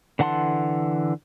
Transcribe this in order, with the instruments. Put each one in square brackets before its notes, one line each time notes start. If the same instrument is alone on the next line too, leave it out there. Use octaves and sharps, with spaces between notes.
[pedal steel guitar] D3 E3 F#5 A5 C6